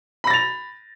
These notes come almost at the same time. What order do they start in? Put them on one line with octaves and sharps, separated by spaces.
B5 A#6 A6 F7